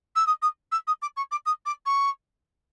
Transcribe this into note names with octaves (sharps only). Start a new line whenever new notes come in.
E6
D#6
D#6
E6
D#6
D6
C#6
D6
D#6
D6
C#6